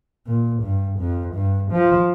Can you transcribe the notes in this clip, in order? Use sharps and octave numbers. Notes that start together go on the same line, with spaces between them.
A#2
G2
F2
G2
F3